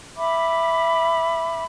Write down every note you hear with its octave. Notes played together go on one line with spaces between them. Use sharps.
E5 B5 D6